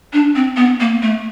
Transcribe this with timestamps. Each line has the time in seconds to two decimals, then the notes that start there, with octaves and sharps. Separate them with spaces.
0.13 D4
0.35 C4
0.57 B3
0.80 A#3
1.02 A3